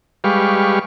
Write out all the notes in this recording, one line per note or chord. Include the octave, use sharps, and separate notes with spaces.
G3 G#3 G4 B4 F5 C#6